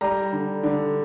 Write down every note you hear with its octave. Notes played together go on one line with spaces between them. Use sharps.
G3 A#5
D3
D3